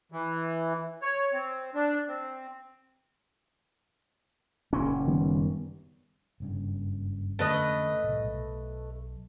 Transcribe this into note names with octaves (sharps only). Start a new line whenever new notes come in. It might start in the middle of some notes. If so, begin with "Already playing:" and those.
E3
C#5
C4
D4
C4
F#1 A#2 C#4
D#3 G3 B3
F#1 G2 C#3
F1 D3 A3 C#4 B4 D#5
C2 A2
B1